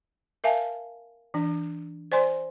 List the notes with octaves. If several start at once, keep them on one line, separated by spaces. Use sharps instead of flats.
A#4 E5 F5 G#5 A5
E3 D4
C5 D5 G#5 C6